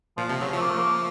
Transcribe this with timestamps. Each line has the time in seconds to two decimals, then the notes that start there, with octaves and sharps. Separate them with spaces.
0.18 A#2 F3
0.29 C3 F3
0.41 C#3 F#3
0.53 F3 A3
0.62 A#3
0.70 A3
0.78 A#3